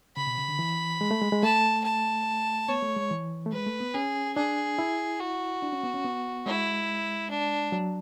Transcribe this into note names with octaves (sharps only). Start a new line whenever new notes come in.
C#3 B5
B2
C#3
D3
E3
G#3
A3
G#3
G#3
A3 A5
A5
B3 C#5
A3
G#3
E3
A3
G#3 B4
A3
B3
C#4 G#4
D4 G#4
E4
F#4
D4
C#4
B3
C#4
B3
G#3 E4
D4
F#3